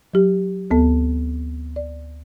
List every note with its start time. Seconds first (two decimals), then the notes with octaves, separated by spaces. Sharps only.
0.14 F#3 G4
0.71 D2 B3 A4
1.76 D5